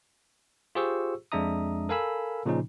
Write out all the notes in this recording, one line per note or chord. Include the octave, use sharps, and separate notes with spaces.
F4 G4 G#4 C5 C#6 E6
F2 G#3 D4 E5 A#5 D#6
A4 A#4 F5 G#5 B5 E6
A#2 C#3 F3 C#4 D#4